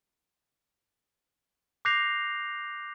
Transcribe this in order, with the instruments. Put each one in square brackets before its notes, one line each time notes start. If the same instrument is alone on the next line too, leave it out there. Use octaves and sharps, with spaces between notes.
[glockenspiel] D6 F#6 G6 A#6 C7 F7